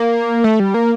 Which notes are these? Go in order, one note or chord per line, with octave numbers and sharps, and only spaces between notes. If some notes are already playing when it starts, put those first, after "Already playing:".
Already playing: A#3
A3
G3
A#3